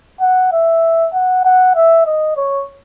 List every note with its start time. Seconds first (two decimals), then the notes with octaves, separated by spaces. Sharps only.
0.21 F#5
0.53 E5
1.13 F#5
1.45 F#5
1.76 E5
2.06 D#5
2.37 C#5